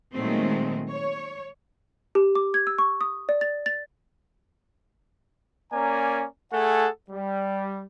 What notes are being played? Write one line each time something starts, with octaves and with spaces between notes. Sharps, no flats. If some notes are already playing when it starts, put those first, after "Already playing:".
A#2 D#3 F#3 G#3 A3 C4
C#5
G4
D6
G#6
E6
C#6
D#6
D5
A6
A6
A#3 C#4 D5 G#5 A#5
A3 G#4 A4 F#5 G#5
G3